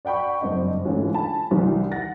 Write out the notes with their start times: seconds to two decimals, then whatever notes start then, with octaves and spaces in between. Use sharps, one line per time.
0.05 D5 F#5 G5 B5 C#6
0.41 F#1 G2 C4 D4 D#5
0.85 C#2 G#2 D3 E3 A3 C#4
1.14 G#5 A5 B5
1.51 C2 D#3 E3
1.92 F#5 A6 A#6